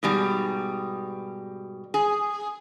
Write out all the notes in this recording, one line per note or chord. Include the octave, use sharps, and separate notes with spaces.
G#2 B2 G3
G#4